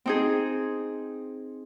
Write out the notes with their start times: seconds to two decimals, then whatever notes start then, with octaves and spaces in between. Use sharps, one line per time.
0.06 C4 D#4 G#4